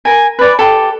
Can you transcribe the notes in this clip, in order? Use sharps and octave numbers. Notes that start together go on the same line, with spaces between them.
A#4 G#5
B4 D5
G4 A4